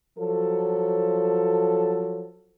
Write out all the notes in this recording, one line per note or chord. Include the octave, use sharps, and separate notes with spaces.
F3 F#3 A4